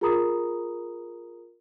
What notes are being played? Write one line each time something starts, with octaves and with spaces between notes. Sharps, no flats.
F4 G#4 A#4 A#5 B5 D#6